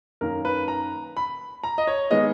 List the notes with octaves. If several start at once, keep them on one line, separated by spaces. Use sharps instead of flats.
F#2 D#3 A#3 A#4
B4
A#5
B5
A#5
D#5
C#5
D#3 G#3 B3 D#5